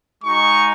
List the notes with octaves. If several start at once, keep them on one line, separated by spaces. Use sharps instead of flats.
G#3 D#4 F#4 C#6